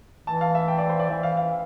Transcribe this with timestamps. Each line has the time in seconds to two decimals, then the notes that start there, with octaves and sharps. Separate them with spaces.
0.27 E3 A5
0.41 F5
0.55 E5
0.68 G5
0.78 D5
0.89 C5
1.00 D5
1.10 E3 E5
1.23 F5
1.37 F5